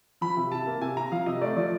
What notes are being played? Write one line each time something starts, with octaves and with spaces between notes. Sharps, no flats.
F3 B5
C3
C3 A5
A#3
C3 G#5
C3 A#5
F3 F5
C3 D#5
A3 D5
F3 D5